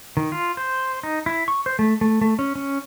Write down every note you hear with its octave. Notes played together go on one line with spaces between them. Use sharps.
D#3
F4
C5
D#4
E4
C#6
C5
A3
A3
A3
C#4
C#4